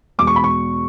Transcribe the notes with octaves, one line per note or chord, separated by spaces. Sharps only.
E2 B2 G#3 D6
C#6
B5
C#6